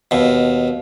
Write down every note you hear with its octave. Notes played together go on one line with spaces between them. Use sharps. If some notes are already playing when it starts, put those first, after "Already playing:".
D#2 B2